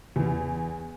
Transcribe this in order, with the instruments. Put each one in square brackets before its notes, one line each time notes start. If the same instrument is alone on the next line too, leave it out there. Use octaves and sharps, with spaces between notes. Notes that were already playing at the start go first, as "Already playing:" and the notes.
[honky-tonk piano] E2